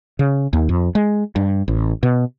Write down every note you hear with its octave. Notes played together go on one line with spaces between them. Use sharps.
C#3
D#2
F2
G#3
G2
A1
B2